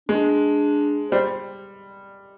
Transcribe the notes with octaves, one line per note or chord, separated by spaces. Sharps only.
G#3 D4
G3 C5